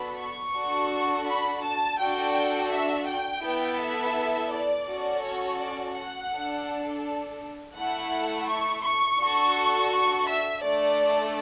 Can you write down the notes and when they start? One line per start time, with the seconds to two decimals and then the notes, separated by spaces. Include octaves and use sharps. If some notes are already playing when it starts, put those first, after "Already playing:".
Already playing: B3 D4 F#4 A4 B5
0.20 C#6
0.56 D4 F#4 A4
1.27 B5
1.63 A5
1.99 D4 F#4 A4 G5
2.72 E5
3.07 G5
3.43 B3 E4 A4
3.80 E5
4.51 D5
4.86 C#4 F#4 A4
5.23 C#5
5.59 D5
5.95 F#5
6.31 D4 A4
7.75 A3 E4 A4 F#5
8.46 C#6
8.83 C#6
9.19 D4 F#4 A4
9.91 C#6
10.27 E5
10.62 A3 D4 A4 D5